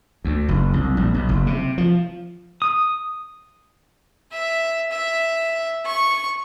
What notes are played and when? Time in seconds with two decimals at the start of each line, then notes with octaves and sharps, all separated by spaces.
0.24 D2
0.49 F#1
0.73 C2
0.97 A#1
1.14 B1
1.29 F#1
1.47 C3
1.78 F3
2.62 D#6
4.32 E5
4.91 E5
5.86 C#6